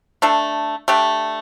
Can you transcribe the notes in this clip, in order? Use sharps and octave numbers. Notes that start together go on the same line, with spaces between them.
A3 D4 A4
A3 D4 G4